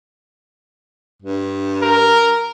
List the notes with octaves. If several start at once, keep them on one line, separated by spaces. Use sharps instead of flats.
G2
A#4